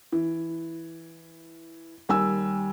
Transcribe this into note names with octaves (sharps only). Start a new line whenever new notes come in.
E3
D#2 G3 G#5 E6